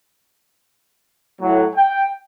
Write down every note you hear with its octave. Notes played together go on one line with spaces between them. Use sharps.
A2 F#3
G5